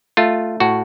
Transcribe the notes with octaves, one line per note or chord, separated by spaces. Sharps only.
A3 F4
A2 F#4